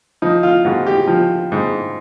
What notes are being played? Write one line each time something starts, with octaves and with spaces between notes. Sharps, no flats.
F3 D#4
F4
G#2 F#4
G4
F3
G#2